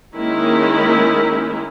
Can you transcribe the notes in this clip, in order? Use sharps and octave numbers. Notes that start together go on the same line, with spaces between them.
D#3 G#3 A#3 C#4 D#4 E4